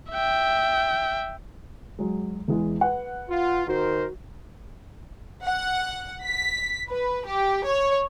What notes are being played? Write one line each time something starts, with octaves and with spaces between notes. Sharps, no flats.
E5 G5
F#3 G#3
E2 E3 G#3
B4 F#5
F4
D#3 F#4 A#4 C5
F#5
B6
B4
G4
C#5